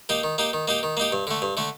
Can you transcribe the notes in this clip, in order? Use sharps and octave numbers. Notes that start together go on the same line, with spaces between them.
A#3 D#4 G4
D#3
A#3 D#4 G4
D#3
A#3 D#4 G4
D#3
A#3 D#4 G4
G2
D3 A3
G2
D3 A3